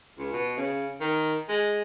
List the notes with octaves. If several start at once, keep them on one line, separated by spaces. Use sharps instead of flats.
C#2
B2
C#3
D#3
G#3